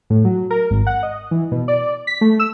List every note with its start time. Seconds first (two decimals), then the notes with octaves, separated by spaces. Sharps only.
0.10 A2
0.25 F#3
0.50 A#4
0.70 G#1
0.87 F#5
1.03 D#5
1.31 E3
1.52 B2
1.68 D5
2.07 B6
2.21 A3
2.40 E6